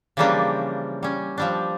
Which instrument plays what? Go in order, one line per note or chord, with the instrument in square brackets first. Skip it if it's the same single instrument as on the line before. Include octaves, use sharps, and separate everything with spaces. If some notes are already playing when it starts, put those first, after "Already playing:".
[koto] C#3 E3 F3 G3 A#3 D4
G3 C#4
F3 G3 D4